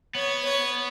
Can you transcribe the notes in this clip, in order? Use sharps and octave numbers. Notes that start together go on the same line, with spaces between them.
B3 C#5
C#5